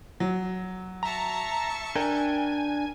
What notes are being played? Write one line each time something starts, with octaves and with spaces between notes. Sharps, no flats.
F#3
E5 A5 A#5 C#6
D4 A#4 G5 G#5